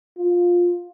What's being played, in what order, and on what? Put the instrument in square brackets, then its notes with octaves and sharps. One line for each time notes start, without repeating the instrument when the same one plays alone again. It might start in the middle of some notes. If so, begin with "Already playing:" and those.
[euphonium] F4